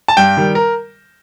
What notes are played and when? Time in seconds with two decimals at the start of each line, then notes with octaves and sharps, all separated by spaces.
0.08 A5
0.17 G2 G5
0.37 D#3 G3
0.55 A#4